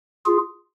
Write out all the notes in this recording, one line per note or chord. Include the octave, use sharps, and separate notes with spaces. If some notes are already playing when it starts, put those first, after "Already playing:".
F4 G#4